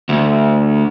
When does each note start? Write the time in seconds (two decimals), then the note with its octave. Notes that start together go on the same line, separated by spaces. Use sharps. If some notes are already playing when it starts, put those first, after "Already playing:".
0.09 D2